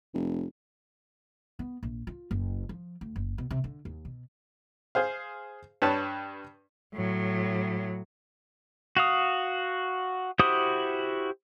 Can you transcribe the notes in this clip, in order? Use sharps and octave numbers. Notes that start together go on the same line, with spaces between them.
F1
B3
A#1
F4
F#1
F3
D2
F#1
B2
C3
D3
D#2
B2
G#4 C5 F5
G2 B4 C#5 A5
A2 F#3
F#4 F5 D#6
E4 F#4 G4 C5 D#6